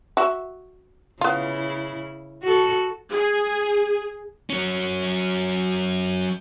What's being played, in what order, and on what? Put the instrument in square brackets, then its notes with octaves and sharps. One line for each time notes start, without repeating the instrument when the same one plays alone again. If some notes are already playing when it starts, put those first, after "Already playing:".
[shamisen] F#4 E5
[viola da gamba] C#3 E4 [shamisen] B3 F4
[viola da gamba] F#4 A4
[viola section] G#4
[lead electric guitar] F#3 C#4